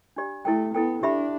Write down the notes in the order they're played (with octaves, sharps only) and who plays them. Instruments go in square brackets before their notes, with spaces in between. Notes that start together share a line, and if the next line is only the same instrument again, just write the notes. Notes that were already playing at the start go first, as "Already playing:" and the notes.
[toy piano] D4 G4 D5 B5
[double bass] A3 [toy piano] E4 A4 G5
[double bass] B3 [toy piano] E4 A4 G5
[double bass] D4 [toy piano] G4 E5 B5